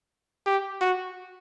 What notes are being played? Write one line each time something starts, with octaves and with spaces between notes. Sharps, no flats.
G4
F#4